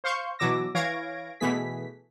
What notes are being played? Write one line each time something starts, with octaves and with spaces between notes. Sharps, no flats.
C5 F5 C6 C#6 G6
B2 E3 F#3 D6 E6 A#6
E3 C#5 F5 G#6 A#6 D7
B2 E3 A3 G#4 B6